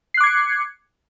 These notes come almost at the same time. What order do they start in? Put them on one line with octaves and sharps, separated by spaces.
C7 F#6 D6 G#6 C#7